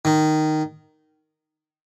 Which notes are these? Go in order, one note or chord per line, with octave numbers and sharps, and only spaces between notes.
D#3